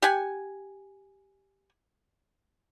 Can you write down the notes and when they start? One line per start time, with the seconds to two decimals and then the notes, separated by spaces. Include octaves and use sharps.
0.02 G4 F#5 G#5